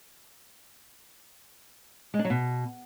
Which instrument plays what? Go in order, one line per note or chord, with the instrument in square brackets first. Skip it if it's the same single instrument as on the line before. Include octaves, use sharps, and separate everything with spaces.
[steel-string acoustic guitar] G#3
D4
F#3
B2